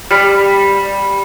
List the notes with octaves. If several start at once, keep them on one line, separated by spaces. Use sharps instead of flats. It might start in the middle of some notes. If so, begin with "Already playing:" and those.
G3